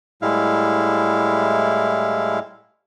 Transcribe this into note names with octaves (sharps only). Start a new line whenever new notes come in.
A2 G3 G#3 E4 F5